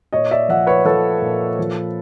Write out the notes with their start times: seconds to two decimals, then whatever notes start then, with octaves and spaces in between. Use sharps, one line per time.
0.13 A#2 C#5 D#5
0.31 D5 E5
0.49 F3 E5 F#5
0.67 B4 C#5
0.85 F3 A4 B4
1.22 A#2
1.59 F3